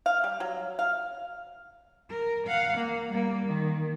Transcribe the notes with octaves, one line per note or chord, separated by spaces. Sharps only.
F5
G3
F#3
F5
A#4
F5 F#5
A#3
G3 A#3
D#3